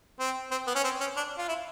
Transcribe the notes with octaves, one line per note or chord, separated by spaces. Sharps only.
C4
C4
B3
C#4
C4
C#4
D4
F4
E4